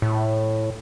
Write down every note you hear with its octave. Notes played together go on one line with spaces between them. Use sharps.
A2